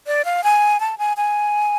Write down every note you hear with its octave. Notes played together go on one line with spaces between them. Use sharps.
D5
F5
G#5
A5
G#5
G#5